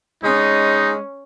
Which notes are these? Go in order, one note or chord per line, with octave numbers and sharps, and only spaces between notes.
G#3 C#4 D#4